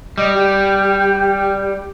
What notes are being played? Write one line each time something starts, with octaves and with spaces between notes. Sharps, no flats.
G3 D#5
G4